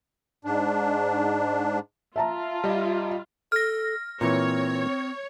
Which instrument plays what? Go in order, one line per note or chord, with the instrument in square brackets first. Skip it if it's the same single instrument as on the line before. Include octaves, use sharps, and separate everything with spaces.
[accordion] G#2 D4
[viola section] F4 [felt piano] E5 A5 A#5
[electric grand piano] G3 D#5
[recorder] A4 [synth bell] F6 A#6
[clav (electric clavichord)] A#2 E3 [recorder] C4 [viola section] C#5